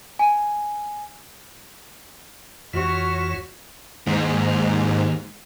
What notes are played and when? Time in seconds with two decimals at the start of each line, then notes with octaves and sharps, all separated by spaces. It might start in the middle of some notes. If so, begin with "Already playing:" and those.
0.19 G#5
2.74 F2 E3 F4 F#4 C#5
4.07 D#2 G#2